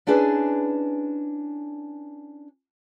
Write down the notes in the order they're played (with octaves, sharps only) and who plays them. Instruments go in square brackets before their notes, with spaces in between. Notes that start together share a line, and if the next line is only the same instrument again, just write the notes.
[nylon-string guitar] C#4 D4 E4 G#4 B4 D5